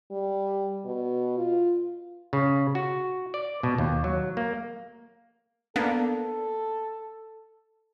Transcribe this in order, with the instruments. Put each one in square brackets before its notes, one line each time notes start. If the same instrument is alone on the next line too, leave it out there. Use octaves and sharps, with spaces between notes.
[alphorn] G3
B2
F4
[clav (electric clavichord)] C#3
F#4
D5
B2
D#2
F#3
A#3
[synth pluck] A#3 B3 D4 [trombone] A4